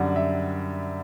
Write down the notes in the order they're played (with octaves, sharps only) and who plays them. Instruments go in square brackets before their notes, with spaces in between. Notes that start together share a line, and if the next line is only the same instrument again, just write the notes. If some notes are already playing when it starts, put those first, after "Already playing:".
Already playing: [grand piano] F#2 D3 G3 F#5
E5